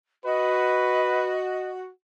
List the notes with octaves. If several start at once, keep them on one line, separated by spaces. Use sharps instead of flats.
F#4 B4 D#5